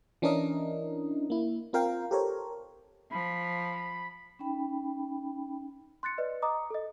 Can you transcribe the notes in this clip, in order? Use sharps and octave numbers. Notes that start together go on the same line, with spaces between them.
E3 C#4 D4 E4 A#4 D#5
A#3 E4
C4 F4 A#4 F5 G5
G4 A4 A#4 C5 C#5
F3 B5
C#4 D#4 G5 B5
C6 F#6 A6 C#7
B4 D5 D#5
D#5 A#5 D6 D#6
A4 D#5